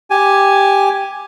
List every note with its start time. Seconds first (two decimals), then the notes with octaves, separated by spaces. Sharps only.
0.10 G4 G#5